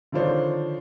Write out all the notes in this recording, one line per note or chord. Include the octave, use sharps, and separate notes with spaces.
D3 D#3 F3 D4 C5 C#5